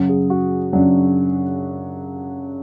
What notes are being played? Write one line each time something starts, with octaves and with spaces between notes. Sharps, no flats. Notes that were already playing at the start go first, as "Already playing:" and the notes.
Already playing: F#2 C#3 F#3
G#4
F#4
F#2 C#3 F#3 D4